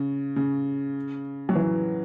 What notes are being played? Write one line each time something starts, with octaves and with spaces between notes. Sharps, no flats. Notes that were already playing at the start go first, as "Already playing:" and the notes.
Already playing: C#3
C#3
F#3
E3